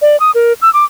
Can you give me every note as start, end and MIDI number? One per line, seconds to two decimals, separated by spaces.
0.02 0.19 74
0.20 0.31 87
0.35 0.53 70
0.62 0.72 88
0.74 0.85 86